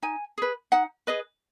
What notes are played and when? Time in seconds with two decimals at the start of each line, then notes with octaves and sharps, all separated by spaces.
0.02 D#4 G#5
0.38 G#4 B4
0.72 D#4 F#5
1.07 G#4 B4 D#5